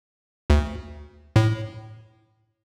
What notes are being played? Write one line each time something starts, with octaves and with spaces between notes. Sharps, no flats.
D2
A2